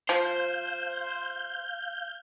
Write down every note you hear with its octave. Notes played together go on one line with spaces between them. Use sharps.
F3 C5 F5 G6